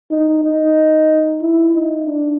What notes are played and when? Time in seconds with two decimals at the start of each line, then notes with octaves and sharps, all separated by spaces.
0.11 D#4
0.44 D#4
1.42 E4
1.74 D#4
2.07 D4